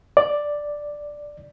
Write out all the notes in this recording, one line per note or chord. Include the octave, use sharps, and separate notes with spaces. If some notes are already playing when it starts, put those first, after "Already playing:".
D5